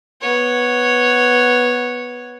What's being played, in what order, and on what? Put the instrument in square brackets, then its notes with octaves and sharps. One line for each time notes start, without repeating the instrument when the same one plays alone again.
[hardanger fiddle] B3 C#5